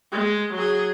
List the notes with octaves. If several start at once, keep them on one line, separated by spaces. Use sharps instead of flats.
G#3
F#3 G#4